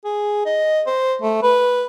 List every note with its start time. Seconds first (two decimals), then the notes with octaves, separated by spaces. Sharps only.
0.05 G#4
0.46 D#5
0.87 C5
1.22 A3
1.43 B4